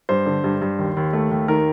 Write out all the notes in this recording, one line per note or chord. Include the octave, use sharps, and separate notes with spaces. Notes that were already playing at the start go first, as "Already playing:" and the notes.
G2 C5
D3
G2
G2
D#2
D#2
A3
D#2
D#3 A#4